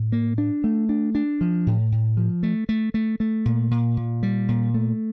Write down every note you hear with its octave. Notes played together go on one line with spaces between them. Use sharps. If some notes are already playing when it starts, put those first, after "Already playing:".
Already playing: A2
A#3
D4
A3
D4
D4
F3
A2
A2
F3
A3
A3
A3
A3
A#2
A#2
A#2
G3
A#2
A3